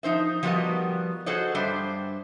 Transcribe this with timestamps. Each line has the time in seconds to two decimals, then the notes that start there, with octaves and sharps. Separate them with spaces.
0.03 F3 D#4 C5 E5
0.43 F3 G3 B3 F#4 A#4 D#5
1.26 F#4 G#4 A4 C5 C#5 D#5
1.55 G2 G3 D4 C5 E5